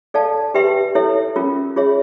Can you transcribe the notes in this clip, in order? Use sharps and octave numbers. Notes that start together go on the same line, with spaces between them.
A4 D5 F5 A5
G4 B4 E5 G5 C6
E4 A4 C#5 E5
C#4 F4 A#4
F4 G#4 C#5 E5